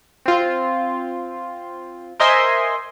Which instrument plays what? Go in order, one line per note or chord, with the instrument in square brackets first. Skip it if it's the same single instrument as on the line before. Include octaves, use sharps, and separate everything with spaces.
[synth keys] C4 F4
A#4 C5 D#5 E5 G#5 C6